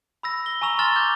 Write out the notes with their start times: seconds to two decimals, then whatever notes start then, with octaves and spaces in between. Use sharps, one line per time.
0.23 B5 E6 A#6
0.46 G7
0.62 G#5 A#5 C#6 E6 F7
0.79 G#5 A#5 C6 F6 A6 G7
0.96 D6 G6